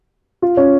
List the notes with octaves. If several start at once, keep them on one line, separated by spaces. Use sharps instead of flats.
F4
C#4